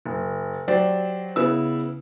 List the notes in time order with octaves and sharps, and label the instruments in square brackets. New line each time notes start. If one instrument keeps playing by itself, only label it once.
[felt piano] F#1
F#3 G4 C5 D5
C#3 B3 E4 E6